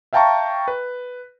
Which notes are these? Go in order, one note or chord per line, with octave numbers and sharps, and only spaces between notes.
E5 F5 G5 A5 A#5 C#6
B4